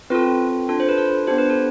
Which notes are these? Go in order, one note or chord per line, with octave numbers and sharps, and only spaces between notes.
C4 F4 A4 B4
D4 F4 A4
C5
B4
A4
B3 D4 G4 C5
B4
A4